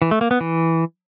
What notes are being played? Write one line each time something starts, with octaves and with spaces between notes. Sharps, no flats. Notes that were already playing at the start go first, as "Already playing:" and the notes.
E3
A3
A#3
B3
E3